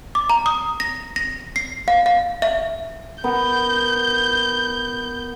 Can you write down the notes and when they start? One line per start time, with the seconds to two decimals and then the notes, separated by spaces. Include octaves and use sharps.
0.15 D6
0.30 A#5
0.46 D#6
0.80 A#6
1.16 A#6
1.56 C7
1.88 F5
2.06 F5
2.42 E5
3.24 B3 A#4 G6